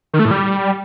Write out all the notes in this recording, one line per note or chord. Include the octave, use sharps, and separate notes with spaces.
D#3
A3
A2
G3